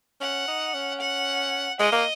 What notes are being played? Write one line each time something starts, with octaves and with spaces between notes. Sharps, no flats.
C#4 F#5
D#4
C#4
F#5
G#3 D#5
A#3